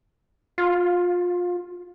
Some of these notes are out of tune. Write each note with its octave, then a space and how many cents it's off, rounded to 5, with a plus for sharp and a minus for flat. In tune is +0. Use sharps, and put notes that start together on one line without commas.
F4 +25